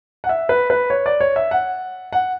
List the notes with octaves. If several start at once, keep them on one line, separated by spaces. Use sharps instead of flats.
F#5
E5
B4
B4
C#5
D5
C#5
E5
F#5
F#5